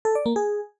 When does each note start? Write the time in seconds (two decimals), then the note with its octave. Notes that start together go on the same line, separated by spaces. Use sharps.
0.05 A4
0.15 D5
0.26 A#3
0.36 G#4